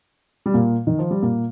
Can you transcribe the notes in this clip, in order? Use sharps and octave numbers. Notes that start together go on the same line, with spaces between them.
G3
A#2 A#3
D#3
F3
G3
A#2 A#3